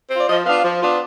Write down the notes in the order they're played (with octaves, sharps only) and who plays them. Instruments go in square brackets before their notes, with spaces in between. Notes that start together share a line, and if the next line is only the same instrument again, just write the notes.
[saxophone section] C4 F4
D5
F3 D#5
B3 D4 F4 F5
F3
B3 D4 F4